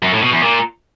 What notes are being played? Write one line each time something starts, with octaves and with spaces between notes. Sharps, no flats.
F#2
A2
B2
E2
A#2